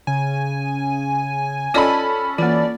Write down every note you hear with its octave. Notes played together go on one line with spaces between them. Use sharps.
C#3 G#5
C#4 F4 A4 D5 D#5 B5
E3 A#3 F4 D5